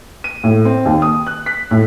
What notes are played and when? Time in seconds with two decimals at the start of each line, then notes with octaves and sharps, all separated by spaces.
0.24 D#7
0.44 A2
0.65 C4
0.86 D#2
1.02 D#6
1.27 F#6
1.46 B6
1.71 A2